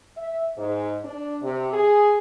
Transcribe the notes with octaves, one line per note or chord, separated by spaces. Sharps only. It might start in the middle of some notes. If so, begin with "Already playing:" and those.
E5
G#2
D4
C3
G#4